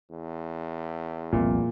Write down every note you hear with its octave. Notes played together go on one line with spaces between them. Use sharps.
E2
F1 C2 A#2 C4